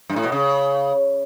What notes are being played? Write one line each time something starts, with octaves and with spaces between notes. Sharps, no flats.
G2
A2
B2
C#3